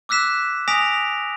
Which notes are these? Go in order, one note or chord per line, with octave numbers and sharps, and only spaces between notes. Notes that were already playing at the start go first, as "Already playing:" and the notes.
D6 E6 F#6 B6 E7
G#5 D#6 A#6 B6 D7 F7